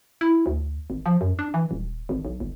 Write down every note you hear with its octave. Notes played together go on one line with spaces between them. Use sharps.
E4
D2
G#1
F3
F#2
D4
E3
D#1
G#1
B1
G1